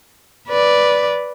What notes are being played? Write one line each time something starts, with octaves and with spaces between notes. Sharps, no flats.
B4 D5